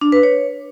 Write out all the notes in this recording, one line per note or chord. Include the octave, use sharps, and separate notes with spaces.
D4
B4
C#5